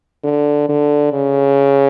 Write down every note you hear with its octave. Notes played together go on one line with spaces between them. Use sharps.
D3
D3
C#3